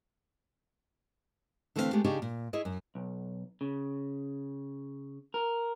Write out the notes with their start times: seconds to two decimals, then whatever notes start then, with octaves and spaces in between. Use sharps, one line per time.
1.76 D3 E3 A3 C4 G#4 F5
1.93 G#3 A3 B3 G4
2.04 C#3 D4 D#4 G4 G#4 C#5
2.22 A#2
2.53 E4 G#4 C#5 D#5
2.65 F#2
2.95 B1
3.61 C#3
5.34 A#4